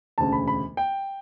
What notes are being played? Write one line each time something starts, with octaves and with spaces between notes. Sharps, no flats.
E1 D2 C#3 A5
B5
B5
G5